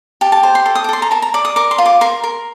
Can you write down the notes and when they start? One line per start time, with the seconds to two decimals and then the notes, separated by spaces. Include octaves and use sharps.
0.21 G4 A5
0.32 A5
0.43 C5
0.55 C6
0.66 A4
0.75 D#6
0.84 D6
0.89 A4 C6
1.02 A#5
1.11 A#4 A5
1.22 A#5
1.34 D5 D6
1.45 D#6
1.56 A#4 D6
1.71 C6
1.78 F4
1.86 D6
2.01 A#4 C6
2.24 A#4